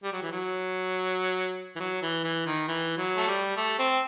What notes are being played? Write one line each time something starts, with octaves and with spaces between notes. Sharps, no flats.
G3
F#3
E3
F#3
E3
F#3
E3
E3
D#3
E3
F#3
A3
G3
A3
C4